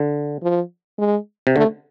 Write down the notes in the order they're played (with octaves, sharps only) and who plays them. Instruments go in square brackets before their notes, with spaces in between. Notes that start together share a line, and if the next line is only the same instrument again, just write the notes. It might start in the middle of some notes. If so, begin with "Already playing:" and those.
Already playing: [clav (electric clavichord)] D3
[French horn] F3
G#3
[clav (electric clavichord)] C3
[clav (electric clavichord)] D3 [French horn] A3